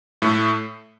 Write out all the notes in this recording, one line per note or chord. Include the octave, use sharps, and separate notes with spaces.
A2 A3